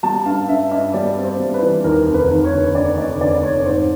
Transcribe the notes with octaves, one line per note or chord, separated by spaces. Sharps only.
G3 A5
G2 F5
G2 E5
G2 D#5
G3 D5
C4
C5
G3
B4
E3
D#2 A#4
F1
B4
D#2
C#5
D3
D3 D5
F1 D#5
D3 D5
F1 C#5
G#2 C5